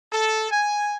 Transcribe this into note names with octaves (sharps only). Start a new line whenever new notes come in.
A4
G#5